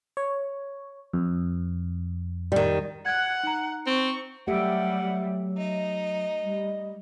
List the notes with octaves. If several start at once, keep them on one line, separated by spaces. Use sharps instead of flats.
C#5
F2
D#3 G3
F#5 F#6 G#6
D#4 A#5
C4 C#6
F#3 G3 A3 G4 E5 F#5
D#4 D#5
G3